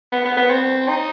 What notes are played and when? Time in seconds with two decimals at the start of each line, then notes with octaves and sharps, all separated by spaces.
0.12 B3
0.25 B3
0.37 B3
0.50 C4
0.88 D#4